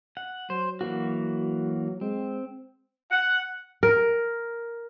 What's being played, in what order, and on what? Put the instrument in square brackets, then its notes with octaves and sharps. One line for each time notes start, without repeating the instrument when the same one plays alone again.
[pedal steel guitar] F#5
[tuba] F#3 [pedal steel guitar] C5
[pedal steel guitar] E3 A#3 F#4
[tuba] G#3 [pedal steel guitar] C4
[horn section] F#5
[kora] A#4